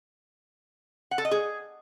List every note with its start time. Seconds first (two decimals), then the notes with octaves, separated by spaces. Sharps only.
1.11 F#5
1.18 A4
1.25 D#5
1.31 G#4